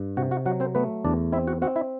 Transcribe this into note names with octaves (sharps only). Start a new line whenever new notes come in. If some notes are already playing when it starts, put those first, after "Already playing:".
Already playing: G2
C3 F#4 F#5
F#4 F#5
F#3 F#4 F#5
C4 C5
A3 B3 B4
E2 D4 D5
C4 E4 E5
F#4 F#5
C4 F#4 F#5
E4 E5